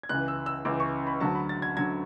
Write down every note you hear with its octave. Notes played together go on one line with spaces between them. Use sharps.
G#6
C#2 C#3 E3 F#6
E6
E6
C#2 C#3 E3 D6
C#6
B5
D2 D3 F#3 A5
B5
A6
G#6
D3 F#3 G#6